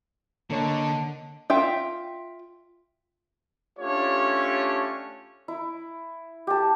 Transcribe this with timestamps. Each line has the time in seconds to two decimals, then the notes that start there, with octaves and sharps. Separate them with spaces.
0.50 D3 A#3 A4 C#5 D#5 A5
1.50 F4 E5 G5
3.79 A3 C#4 D4 F4 G4 C#5
5.48 E4
6.47 G4 A5